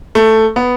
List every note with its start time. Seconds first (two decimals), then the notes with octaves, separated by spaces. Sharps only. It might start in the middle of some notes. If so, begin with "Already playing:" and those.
0.15 A3
0.56 B3